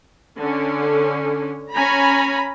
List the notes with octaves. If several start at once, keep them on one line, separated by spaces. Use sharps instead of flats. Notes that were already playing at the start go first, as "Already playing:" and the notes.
D3 C#4
C#4 G#5 A#5 B5